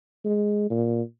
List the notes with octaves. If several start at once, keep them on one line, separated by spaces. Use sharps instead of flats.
G#3
A#2